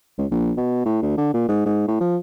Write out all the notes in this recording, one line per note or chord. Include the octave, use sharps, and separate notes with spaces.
C#2
A#1
B2
A2
D2
D3
A#2
G#2
G#2
A2
F3